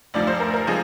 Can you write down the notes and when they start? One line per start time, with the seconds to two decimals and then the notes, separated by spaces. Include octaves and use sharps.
0.14 D2 C3 F3 D5
0.27 C5
0.40 A#4
0.54 A#4
0.67 F3 G#3 C4 G#4